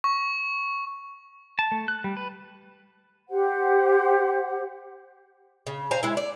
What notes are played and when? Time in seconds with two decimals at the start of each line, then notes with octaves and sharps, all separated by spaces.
0.04 C#6
1.59 A5
1.72 A3
1.88 F#6
2.04 G3
2.17 B4
3.29 G4 C5 F#5
5.67 C#3
5.91 C5 F5 G#5 A#5
6.03 G#3 E4
6.17 D5